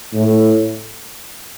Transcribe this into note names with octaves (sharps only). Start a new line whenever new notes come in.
A2